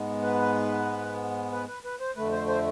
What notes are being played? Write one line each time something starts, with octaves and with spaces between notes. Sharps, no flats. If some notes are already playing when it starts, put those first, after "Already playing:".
Already playing: G#2 G#3 B3
B4
B4
B4
B4
C5
F2 D3 A3 B4
C5
C5